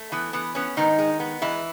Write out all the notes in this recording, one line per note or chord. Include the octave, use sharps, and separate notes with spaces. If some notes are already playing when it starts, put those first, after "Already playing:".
Already playing: A3
E3 B3
E3 B3
B3 C#4
G#2 D#3 D#4
G#3
B3
E3 G#3 E4